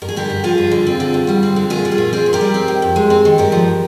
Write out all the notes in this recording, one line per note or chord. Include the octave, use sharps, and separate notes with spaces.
G2 A#4
G#4
D3 G4 A#4
G2
F3 F4 G#4
G2
D3
C4
D3
G2
G3
C4
D3
A#2 F4 G#4
G3
F4 G#4
A#2
C4 G#4 C5
A#2
G4 A#4
G3
C4
D#3
F2
G#3
C4
D#3
G2 G4 A#4
F3